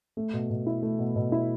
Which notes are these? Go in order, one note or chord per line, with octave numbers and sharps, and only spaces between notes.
A3
B2
B2
E4
A3
B2
B2
E4